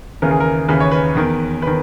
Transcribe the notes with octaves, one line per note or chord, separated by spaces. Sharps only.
D#2 C#3 E3 A#4
G#4
A#4
D#2 C#3 E3 B4
C#5
B4
E2 D#3
D#3 B4